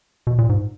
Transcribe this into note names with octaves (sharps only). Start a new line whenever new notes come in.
B2
A#2
G#2